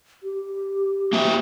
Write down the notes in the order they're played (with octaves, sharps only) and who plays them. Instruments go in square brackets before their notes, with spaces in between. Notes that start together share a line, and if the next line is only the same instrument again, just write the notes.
[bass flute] G4
[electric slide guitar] A#3 F#4 E5